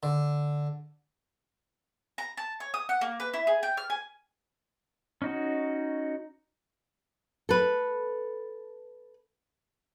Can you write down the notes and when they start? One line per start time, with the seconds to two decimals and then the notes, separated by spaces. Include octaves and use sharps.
0.03 D3
2.18 A#5
2.37 A5
2.60 C#5
2.74 D#6
2.89 F#5
3.01 A#3
3.20 B4
3.34 E4
3.47 G#4
3.63 G5
3.77 F6
3.90 G#5
5.22 C#4 D#4 F#4
7.49 A4 B4